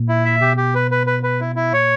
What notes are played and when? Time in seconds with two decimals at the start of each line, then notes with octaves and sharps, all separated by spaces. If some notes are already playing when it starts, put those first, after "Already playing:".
Already playing: A#2
0.09 E4
0.25 E5
0.41 B2 G4
0.57 G4
0.75 B4
0.91 B4
1.07 B4
1.23 B4
1.40 E4
1.56 E4
1.73 A#2 C#5